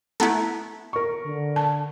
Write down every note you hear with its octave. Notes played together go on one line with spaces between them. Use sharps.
A3 B3 E4 A#5
A#4 C#6
D3
A5